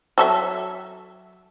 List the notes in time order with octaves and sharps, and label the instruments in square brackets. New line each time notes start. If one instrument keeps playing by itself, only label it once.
[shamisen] F#3 A4 E5